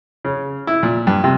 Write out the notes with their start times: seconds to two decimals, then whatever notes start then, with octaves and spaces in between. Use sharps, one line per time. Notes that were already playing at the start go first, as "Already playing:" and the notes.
0.25 C#3
0.67 E4
0.83 A#2
1.07 G2
1.24 C3